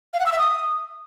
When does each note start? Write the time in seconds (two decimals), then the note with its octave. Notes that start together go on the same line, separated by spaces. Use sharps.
0.13 F5
0.20 F#5
0.26 E6
0.32 E5
0.39 D#6